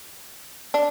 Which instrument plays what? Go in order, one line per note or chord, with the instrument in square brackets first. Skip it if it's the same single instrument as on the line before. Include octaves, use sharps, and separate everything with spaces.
[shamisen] D4